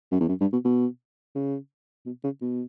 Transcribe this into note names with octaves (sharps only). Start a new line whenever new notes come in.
F#2
E2
F#2
G2
B2
B2
C#3
B2
C#3
B2